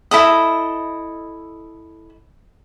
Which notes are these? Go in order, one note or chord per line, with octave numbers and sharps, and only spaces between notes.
E4 A4 D#5